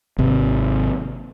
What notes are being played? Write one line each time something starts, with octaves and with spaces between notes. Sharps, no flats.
G#1 C3